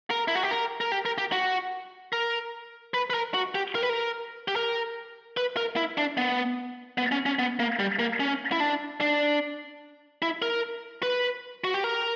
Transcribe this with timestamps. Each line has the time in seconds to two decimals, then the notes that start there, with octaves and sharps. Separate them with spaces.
0.10 A#4
0.28 E4
0.35 F#4
0.43 G4
0.51 A#4
0.81 A#4
0.92 G4
1.05 A#4
1.18 G4
1.32 F#4
2.13 A#4
2.94 B4
3.10 B4
3.14 A#4
3.34 F#4
3.55 G4
3.75 A#4
3.83 B4
3.89 A#4
4.48 G4
4.56 A#4
5.37 B4
5.57 A#4
5.76 E4
5.98 D4
6.17 B3
6.98 B3
7.12 C#4
7.26 C#4
7.39 B3
7.60 A#3
7.79 G3
7.99 A#3
8.20 C#4
8.52 E4
8.60 D4
9.01 D4
10.22 E4
10.42 A#4
11.03 B4
11.64 F#4
11.74 G4
11.84 A#4